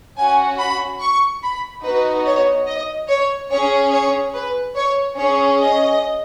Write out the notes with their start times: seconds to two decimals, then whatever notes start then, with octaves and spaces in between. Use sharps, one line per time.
0.18 C#4 F#4 G#5
0.59 B5
1.01 C#6
1.43 B5
1.84 B3 D#4 F#4 B4
2.26 C#5
2.67 D#5
3.09 C#5
3.51 C#4 G#4 C#5
3.92 C#5
4.34 B4
4.75 C#5
5.17 C#4 G#4 C#5
5.59 D#5